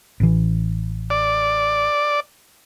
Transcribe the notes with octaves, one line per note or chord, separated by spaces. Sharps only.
A1 E3
D5